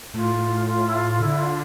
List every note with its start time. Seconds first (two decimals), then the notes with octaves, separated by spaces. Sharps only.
0.14 A2 F4
0.67 F4
0.87 E4
0.93 F4
1.10 F4
1.20 D3 E4
1.38 F4